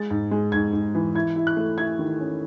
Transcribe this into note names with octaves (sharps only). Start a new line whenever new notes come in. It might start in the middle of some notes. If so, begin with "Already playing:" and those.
Already playing: G#3 A6
G#2
G#3
G#2 G#6
G#2
E3
E4 G#6
E4
F#6
A3
E4 G#6
D#3
C#4